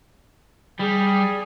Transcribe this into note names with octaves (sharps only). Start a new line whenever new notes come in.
G3 G#4